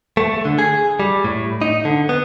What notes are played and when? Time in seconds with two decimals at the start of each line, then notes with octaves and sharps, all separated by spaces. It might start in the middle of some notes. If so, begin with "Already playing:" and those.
0.17 A3
0.45 D3
0.59 G#4
1.00 G3
1.24 A2
1.62 D#4
1.85 D3
2.09 B3